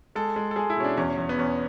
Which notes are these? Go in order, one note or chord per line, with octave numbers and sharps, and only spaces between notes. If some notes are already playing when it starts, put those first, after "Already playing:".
G#3 A4
G#3
A4
G#3 G#4
E4
B2 C#4
D4
E2 C#4
E2
B3
E2 C#4